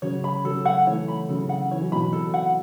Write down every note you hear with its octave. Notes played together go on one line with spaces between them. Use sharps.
C#3 F#3 C#5
B5
C#3 F#3 A4
F#5
E3 A3 C#5
B5
C#3 F#3 A4
F#5
E3 C#5
F#3
B2 E3 B5
A4
F#5